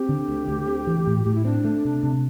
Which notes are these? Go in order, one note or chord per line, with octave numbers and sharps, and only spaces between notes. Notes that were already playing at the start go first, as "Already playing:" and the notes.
Already playing: C4 G4
D3
D2
D2
C4
E3
A2
A2 G4
E4
C4 D4
A3
C3
C3